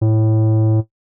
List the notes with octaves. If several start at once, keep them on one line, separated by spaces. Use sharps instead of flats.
A2